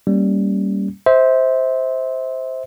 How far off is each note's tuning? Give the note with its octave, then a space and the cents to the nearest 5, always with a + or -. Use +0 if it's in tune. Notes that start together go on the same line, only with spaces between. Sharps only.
G3 +0 A#3 +0 C#4 +0
C5 +0 E5 -30